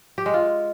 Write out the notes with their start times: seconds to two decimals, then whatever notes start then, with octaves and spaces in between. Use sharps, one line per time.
0.18 G4
0.26 G#3
0.34 F4